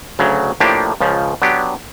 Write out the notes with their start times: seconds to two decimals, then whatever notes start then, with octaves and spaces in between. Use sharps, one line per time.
0.19 D2 C#3 F#3
0.60 A2 F3 A#3 D4 G4
1.01 C#2 C#3 F3
1.42 F#3 B3 D4 G4